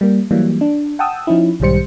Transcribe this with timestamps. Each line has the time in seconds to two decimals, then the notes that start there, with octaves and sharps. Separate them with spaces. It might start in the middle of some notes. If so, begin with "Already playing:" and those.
0.01 G3 A#3
0.31 E3 F#3 G3 A#3
0.61 D4
0.99 F#5 G5 A5 D#6 E6
1.27 F3 C#4 D#4 E4
1.60 B1 G#2 D#3 G3 C5 C#7